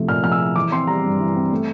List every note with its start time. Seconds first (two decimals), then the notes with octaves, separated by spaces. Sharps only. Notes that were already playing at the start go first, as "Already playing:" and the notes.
Already playing: C3 F3 A3 E4
0.08 A#2 F6
0.24 F3 F6
0.32 E6
0.39 E4
0.56 E3 D6
0.72 C4 C6
0.87 G3 A#5
1.04 G2
1.19 E3
1.36 C4
1.52 A3